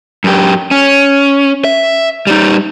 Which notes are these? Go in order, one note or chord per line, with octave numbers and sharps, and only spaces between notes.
F#2 G4
C#4
E5
G3 D#4